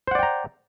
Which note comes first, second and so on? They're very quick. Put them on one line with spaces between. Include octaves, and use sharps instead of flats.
C5 F#5 D5 G5 A#5